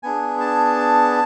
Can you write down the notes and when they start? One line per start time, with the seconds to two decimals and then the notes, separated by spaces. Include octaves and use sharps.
0.03 B3 D4 G#4 G#5
0.40 A5